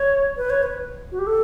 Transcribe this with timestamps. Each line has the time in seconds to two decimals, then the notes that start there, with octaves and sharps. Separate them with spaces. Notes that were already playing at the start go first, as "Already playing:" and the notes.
Already playing: C#5
0.37 B4
0.50 C#5
0.63 B4
1.12 F#4
1.19 G4
1.27 A4